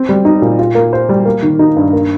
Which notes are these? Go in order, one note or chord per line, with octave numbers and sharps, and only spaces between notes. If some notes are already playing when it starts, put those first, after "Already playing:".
Already playing: C4
G3
D#4
A#2
F4
A#3
C5
G3
A#3
D#3
D#4
G2
A#3